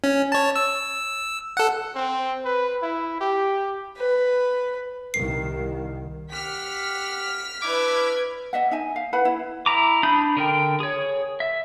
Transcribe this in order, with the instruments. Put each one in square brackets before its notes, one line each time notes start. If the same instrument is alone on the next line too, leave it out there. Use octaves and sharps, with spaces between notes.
[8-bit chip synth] C#4
C#5 A5
E6
A4 F#5
[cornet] C4
B4
E4
G4
[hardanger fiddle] B4
[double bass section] C2 D#3 [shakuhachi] A#4 [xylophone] C7
[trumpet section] G4 F#5 [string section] F6 B6
[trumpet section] D4 E4 [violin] B4 G#6 [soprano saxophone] D6
[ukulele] D#5 E5 F#5
D#4 E5 G#5
F5
E4 B4 F#5 B5
E4
[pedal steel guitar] E4 A#5 D6
D4 B5 D#6 G6
D3 A#4 G5
G#4 C#5
E5